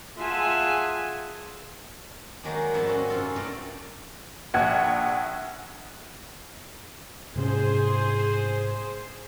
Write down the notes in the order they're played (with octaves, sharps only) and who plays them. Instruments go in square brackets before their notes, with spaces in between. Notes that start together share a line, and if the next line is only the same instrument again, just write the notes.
[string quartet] F4 G#4 E5 F#5 G#5 A5
[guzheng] D#3 F#3 G#3 A#3 D4
F2 G#2 F3 G3 E4
C4 C#4 F#4
F#2 C3 F4 A4 F5
G2 A#2 A3 A#4 D5 F5
[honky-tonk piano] A#1 F#5 G#6
[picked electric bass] G#2 C3 C#4 [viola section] G#4 C5